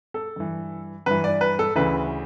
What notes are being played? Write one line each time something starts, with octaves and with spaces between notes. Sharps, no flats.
A4
G2 E3
G2 E3 B4
D5
B4
A4
D2 C#3 E3 B4